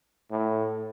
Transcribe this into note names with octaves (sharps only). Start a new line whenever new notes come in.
A2